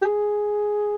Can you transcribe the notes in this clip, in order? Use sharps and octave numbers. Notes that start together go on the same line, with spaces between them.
G4
G#4